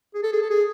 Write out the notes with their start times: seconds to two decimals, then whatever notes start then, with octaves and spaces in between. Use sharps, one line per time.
0.14 G#4
0.23 A4
0.33 G#4
0.42 A4
0.50 G#4